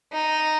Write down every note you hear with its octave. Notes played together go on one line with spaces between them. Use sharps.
D#4